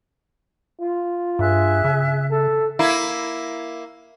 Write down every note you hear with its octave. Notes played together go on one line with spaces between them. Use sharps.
F4
G2 G#4 E5 F#6
C#3
A4
A#3 E4